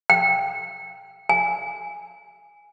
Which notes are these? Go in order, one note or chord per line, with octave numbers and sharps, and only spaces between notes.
G5
G#5